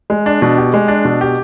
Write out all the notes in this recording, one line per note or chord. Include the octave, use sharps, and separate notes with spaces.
G#3
D4
B2
G4
G#3
D4
B2
G4